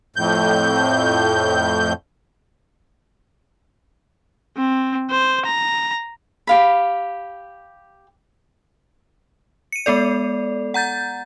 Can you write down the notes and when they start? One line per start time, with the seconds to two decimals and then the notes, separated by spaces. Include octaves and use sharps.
0.16 F2 A2 G6
4.58 C4
5.11 C5
5.46 A#5
6.47 G4 F5 B5
9.72 C#7 D#7
9.86 G#3 B3 A4 D5
10.74 F#5 A#5 G6 A6